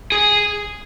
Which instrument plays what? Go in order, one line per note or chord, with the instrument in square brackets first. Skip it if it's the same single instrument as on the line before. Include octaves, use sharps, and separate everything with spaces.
[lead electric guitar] G#4